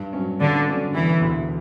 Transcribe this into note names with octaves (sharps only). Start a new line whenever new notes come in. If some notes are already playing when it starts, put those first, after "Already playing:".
Already playing: G2
F#3 C#4
G2 D3
F#3 C#4
E1 E3
D2 D3